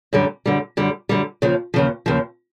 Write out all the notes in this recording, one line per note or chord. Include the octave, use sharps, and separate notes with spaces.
F#2 D3 G3
F#2 D3 G3
F#2 D3 G3
F#2 D3 G3
D#2 C#3 F3
D#2 C#3 F3
D#2 C#3 F3